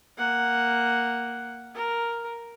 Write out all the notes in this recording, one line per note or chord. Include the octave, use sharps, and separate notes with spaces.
A#3 F#5
A#4